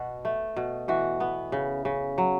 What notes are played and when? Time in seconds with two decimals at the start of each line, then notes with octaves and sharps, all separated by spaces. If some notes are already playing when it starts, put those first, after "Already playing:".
Already playing: B2 F#4
0.25 A3
0.57 B2
0.88 E3 F#4
1.20 B3
1.52 C#3
1.85 C#3
2.18 F#3